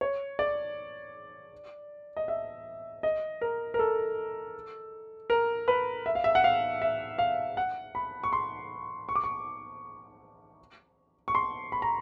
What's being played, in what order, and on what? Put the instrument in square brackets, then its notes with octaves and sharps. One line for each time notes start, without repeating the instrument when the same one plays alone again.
[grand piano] C#5
D5
D#5
E5
D#5
A#4
A#4
A4
A#4
B4
E5
F5
E5
F#5
F5
E5
F5
F#5
B5
C#6
C6
C#6
D6
C#6
C#6
C6
B5
A#5